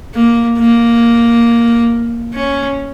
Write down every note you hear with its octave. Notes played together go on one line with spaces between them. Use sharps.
A#3
A#3
C#4